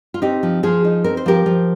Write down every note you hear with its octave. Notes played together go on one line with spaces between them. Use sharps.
F4
C4 D#4 G4
F3
F3 F4 G#4
D#4
C4 A#4
C5
F3 G4 A#4
F3